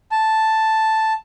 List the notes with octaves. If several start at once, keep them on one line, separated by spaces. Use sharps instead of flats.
A5